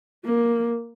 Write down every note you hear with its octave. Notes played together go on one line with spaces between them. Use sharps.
A#3